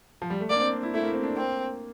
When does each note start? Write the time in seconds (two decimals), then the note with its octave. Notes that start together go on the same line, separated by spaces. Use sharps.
0.22 F3
0.30 G3
0.40 A3
0.49 A#3 D5
0.56 D4
0.60 C4
0.72 D4
0.83 E4
0.94 A3 E4
1.03 A#3
1.13 C4
1.23 D4
1.37 A#3 C4